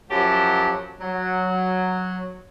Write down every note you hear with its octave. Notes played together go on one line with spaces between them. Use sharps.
F#2 F3 F#3 G4 F#5 A5
F#3